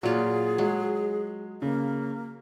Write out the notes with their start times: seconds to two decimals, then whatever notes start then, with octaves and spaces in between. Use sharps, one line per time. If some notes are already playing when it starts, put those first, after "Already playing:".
0.03 A#2 F#3 F4 G#4
0.58 F#3 G#3
1.62 C#3 A#3